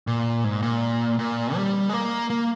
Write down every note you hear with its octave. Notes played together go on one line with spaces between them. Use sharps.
A#2
G#2
A#2
A#2
G3
G#3
A#3
A#3